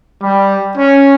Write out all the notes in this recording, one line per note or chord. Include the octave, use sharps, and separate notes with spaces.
G3
C#4